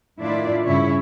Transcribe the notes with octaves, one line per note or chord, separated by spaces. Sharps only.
A2 D#3 D4 E4 F4 D5
G2 C#3 C#4 E4 C#5